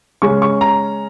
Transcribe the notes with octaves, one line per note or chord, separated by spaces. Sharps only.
C#3 G#3 C#4 C#6
C#6
A#5